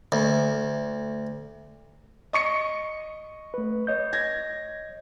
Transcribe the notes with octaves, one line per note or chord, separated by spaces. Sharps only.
D2
D#5 C#6 C#7
A3 B4
C#5 D#5 G6
G#6 A#6